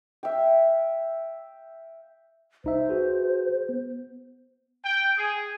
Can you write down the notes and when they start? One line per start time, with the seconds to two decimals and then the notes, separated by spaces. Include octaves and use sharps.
0.23 E5 F5 G5
2.64 C2 D#4 C5 E5
2.89 F#4 G#4 B4
3.69 B3
4.84 G5
5.18 G#4